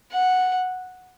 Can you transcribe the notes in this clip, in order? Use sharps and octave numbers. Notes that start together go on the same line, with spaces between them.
F#5